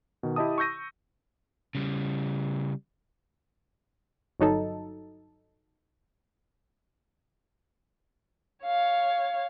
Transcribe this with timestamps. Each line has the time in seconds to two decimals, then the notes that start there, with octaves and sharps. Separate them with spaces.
0.23 B2 D#3
0.36 E4 G4 D#5 A5 D#6
0.58 C#6 E6 G6 A#6 D#7
1.75 C#3 G3
4.40 G1 F#3 D#4 A4
8.65 C#5 F5